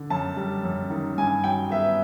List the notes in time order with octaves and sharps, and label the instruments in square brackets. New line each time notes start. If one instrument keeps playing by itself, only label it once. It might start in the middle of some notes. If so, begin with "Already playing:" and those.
Already playing: [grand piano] D3
F#2 A5
G3
F#2
D#3
G2 G#5
F#3 G5
B3 E5